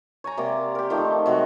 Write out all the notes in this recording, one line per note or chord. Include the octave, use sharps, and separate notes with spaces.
C#5 G#5 A#5
C3 A#3 G4 D5
G4 A#4
D#3 F3 A3
C3 F#3 G#3 F#4